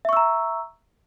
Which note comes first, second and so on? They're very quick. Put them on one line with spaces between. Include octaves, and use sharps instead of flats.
E5 C#6 E6 A#5